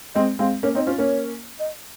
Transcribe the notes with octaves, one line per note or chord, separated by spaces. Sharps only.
G#3 C4 D#5
G#3 C4 F5
A#3 C#4 C#5
C4 D#4 C#5
C#4 F4 C5
A#3 C#4 C#5
D#5